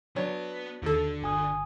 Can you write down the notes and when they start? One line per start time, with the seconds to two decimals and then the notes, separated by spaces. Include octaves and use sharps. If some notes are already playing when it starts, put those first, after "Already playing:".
0.16 F#3 B3 D4 B4 C#5
0.82 D#2 D3 A4
1.22 G1 G#5 D#6